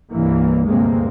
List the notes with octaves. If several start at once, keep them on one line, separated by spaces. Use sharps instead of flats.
C2 G2 E3 A#3
D2 G2 C3 G#3 A#3 C4